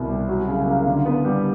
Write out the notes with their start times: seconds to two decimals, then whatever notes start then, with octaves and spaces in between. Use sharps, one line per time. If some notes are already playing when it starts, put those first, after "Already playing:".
Already playing: C2 B2
0.08 G3
0.28 F#3
0.48 C#3
0.67 A#3
0.86 D3
1.06 B3
1.25 G3